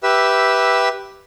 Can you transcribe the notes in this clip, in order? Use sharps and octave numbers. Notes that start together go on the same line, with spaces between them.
G4 B4 E5 E6